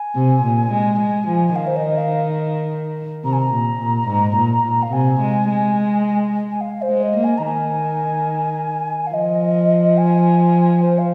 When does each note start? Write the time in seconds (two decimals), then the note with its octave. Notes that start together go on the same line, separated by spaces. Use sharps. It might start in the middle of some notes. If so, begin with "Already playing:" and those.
Already playing: G#5
0.15 C3
0.43 A#2
0.71 G#3
0.99 G#3
1.27 F3
1.48 G#5
1.56 D#3 F5
1.67 C5
1.76 D#5
1.98 F5
3.24 C3 A#5
3.33 G#5
3.40 A#5
3.52 A#2
3.80 A#2
4.08 G#2
4.36 A#2
4.64 A#2
4.83 F5
4.92 C3 G#5
5.21 G#3
5.49 G#3
6.51 G#5
6.61 F5
6.82 C5
6.89 G#3
7.03 D#5
7.17 A#3
7.24 G#5
7.38 A#5
7.45 D#3 G#5
9.07 F5
9.14 F3 D#5
9.97 G#5
10.82 C5
10.98 F5